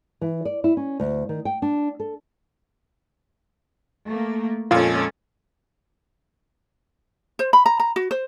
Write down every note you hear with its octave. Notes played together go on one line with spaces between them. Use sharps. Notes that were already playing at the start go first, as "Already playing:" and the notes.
E3
D5
E4
C#4
D2
D#3
G5
D4
A4
A3 A#3
F2 A#2 G#3 C#4 F4 A4
C5
B5
A#5
A#5
F#4
C5